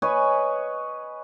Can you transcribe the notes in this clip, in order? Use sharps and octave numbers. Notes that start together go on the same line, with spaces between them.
B4 C#5 D#5 G#5